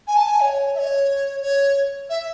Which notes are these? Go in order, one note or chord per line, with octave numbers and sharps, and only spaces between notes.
G#5
A5
G#5
C#5
E5
C#5
C#5
E5